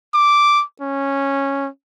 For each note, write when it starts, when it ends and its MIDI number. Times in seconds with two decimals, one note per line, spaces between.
0.14 0.63 86
0.81 1.68 61